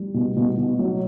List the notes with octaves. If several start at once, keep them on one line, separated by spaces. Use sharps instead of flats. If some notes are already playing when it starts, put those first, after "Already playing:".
Already playing: G3
B2
B2
B2
F#3